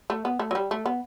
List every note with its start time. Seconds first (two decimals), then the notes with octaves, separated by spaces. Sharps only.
0.10 A3
0.25 B3
0.39 A3
0.51 F#3
0.55 G3
0.71 A3
0.86 B3